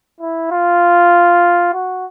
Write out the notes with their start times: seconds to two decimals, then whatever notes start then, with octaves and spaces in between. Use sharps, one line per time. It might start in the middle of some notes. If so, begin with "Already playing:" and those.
0.20 E4
0.51 F4
1.73 F#4